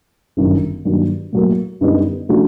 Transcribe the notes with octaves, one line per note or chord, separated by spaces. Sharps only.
G1 F#2 D#3 F#3
G2 D#3 F#3 A#3
A2 F#3 A#3
F#2 D3 G3 B3 D#4
C#3 F3 A3 D4 F#4